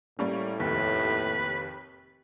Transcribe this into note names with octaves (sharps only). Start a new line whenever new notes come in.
A2 G3 A#3 C#4
F1 D#2 B4